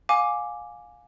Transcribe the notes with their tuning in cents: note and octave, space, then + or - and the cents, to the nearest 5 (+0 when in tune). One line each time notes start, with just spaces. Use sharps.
F5 +25 G#5 +0 D6 +0